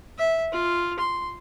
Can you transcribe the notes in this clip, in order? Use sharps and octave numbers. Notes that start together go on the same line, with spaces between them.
E5
F4
C6